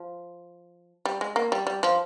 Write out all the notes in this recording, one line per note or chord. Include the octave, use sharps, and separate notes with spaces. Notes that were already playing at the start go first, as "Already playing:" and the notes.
Already playing: F3
G3
G#3
A#3
G3
G3
F3